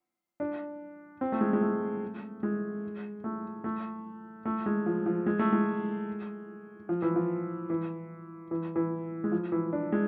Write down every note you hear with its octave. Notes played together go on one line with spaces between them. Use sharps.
D4
C4
A3
G#3
G#3
A3
G#3
A3
A3
A3
G#3
F3
F3
G#3
A3
G#3
F3
E3
F3
E3
E3
E3
G#3
F3
E3
D4
G#3